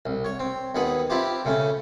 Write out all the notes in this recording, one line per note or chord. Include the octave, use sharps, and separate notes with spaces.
C2
C#5
C4
D#2 B3 G#4 F#5
C4 E4 F4 G4
C#3 A3 C#4